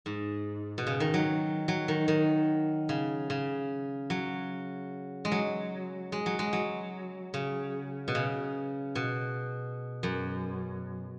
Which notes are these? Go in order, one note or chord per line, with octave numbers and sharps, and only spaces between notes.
G#2
B2
C#3
D#3
F#3
F#3
D#3
D#3
C#3
C#3
F#3
G#3
F#3
G#3
F#3
G#3
F#3
C#3
B2
C#3
B2
F#2